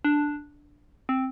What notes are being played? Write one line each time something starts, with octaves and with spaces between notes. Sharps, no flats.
D4
C4